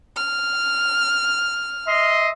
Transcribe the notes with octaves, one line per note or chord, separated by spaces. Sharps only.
F6
D#5 E5 C6